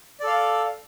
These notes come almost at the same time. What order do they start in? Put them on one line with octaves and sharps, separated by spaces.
D5 A4 F5